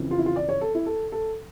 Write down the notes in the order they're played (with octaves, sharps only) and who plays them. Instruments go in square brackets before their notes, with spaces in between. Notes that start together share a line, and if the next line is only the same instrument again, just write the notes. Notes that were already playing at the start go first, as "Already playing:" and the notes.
Already playing: [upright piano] F2 C#3 E3
F4
E4
F4
D5
C#5
A4
E4
A4
A4